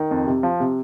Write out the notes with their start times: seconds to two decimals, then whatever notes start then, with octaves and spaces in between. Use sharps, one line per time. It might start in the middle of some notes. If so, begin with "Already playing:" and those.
Already playing: D#3
0.11 F2
0.26 C3
0.43 F3
0.60 C3